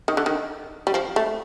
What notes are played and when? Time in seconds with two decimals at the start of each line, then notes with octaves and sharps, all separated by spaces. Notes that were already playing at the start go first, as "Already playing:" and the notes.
0.08 D#3
0.17 D3
0.26 D#3
0.87 G3
0.94 F3
1.16 A3